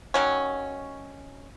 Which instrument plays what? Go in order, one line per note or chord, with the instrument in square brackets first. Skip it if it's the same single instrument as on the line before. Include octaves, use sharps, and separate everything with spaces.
[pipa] D#3 F#3 C#4